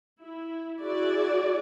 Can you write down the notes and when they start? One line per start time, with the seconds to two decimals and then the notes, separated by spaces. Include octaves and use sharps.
0.20 E4
0.81 E4 F#4 G#4 D5